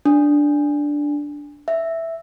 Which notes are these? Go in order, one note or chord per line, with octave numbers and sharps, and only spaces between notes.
D4
E5